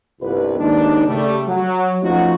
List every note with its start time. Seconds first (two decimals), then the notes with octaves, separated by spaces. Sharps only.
0.22 G1 C2 B4
0.59 D#2 G#2 D4 D#4
1.07 C#3 G3 A3
1.47 F#3
2.03 F3 A3 C#4 D#4 F4 F#4